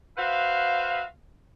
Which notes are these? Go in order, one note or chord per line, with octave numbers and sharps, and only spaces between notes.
F#4 B4 C5 E5 F5